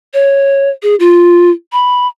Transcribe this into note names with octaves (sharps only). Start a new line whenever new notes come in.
C#5
G#4
F4
B5